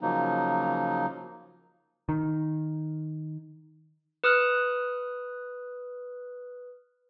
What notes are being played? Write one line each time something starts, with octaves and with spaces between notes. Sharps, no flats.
C#3 F3 F#3 A#3 D#4
D#3
B4 D#6 F6 F#6